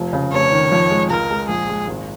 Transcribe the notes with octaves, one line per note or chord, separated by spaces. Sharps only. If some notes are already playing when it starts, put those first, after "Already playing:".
Already playing: F1 F3
C#3
F1 C#5
D#3
F2
G#3
C#2 A#4
G#3
A#1 G#4
G#3
G#1